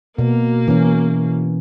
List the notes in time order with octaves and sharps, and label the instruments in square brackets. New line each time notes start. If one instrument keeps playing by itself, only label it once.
[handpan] B2 [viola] A#3
[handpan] E3 C#4